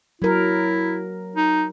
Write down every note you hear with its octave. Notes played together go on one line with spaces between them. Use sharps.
F#3 E4 A#4
D#4